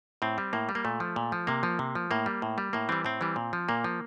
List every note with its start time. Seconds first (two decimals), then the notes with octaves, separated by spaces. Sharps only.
0.22 A2 C4
0.38 G3
0.53 A2 A#3
0.69 G3
0.75 A#3
0.85 A#2 A3
1.00 F3
1.16 A#2
1.32 F3
1.47 C3 A#3
1.63 F3
1.79 C3
1.95 F3
2.11 A2 A#3
2.26 G3
2.42 A2
2.58 G3
2.73 A2 A#3
2.89 E3 G3 C4
3.05 A2 C4
3.21 E3 G3
3.36 A#2
3.53 F3
3.69 A#2 A#3
3.84 F3